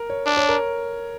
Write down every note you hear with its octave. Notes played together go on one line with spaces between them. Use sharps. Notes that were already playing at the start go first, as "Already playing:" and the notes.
Already playing: A#4
C#5
D4
C#5
A#4